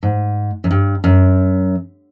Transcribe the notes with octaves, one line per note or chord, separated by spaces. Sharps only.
G#2
F#2
G2
F#2